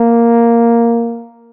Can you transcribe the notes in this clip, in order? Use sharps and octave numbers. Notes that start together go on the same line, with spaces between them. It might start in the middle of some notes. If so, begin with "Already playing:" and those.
Already playing: A#3